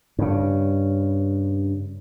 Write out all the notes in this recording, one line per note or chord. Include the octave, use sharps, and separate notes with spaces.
G2 C#3